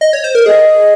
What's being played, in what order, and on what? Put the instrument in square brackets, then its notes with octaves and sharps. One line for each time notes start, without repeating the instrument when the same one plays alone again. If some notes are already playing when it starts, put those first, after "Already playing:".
[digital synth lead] D#5
C#5
C5
A#4
[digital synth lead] G#4 [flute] D#5